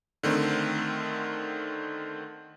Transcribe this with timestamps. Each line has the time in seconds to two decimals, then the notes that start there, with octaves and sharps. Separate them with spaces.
0.23 D3 D#3 A3 C4